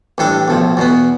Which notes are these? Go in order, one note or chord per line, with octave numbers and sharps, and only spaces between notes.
A1 A2 G3 D4 A4
B1 A2 F3
E2 B2 B3